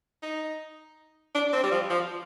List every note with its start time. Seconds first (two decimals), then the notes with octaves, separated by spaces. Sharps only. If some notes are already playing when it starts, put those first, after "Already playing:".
0.23 D#4
1.35 D4
1.53 C4
1.63 G3
1.72 F3
1.90 F3